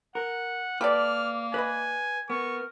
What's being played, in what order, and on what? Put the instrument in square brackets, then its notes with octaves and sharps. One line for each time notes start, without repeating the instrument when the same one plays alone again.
[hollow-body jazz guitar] A#4 [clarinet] F#5
[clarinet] A#3 [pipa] G4 A4 D5 [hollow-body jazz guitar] B4 [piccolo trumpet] F6
[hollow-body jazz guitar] B4 D#5 B5 [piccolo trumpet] G#5
[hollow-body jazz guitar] B3 [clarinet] A#4 [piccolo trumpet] C#6